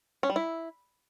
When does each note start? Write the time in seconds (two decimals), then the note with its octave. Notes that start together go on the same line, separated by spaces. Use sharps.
0.23 C#4
0.30 G3
0.36 E4